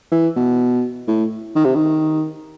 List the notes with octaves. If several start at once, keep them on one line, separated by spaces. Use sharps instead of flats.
E3
B2
A2
D#3
C3
D#3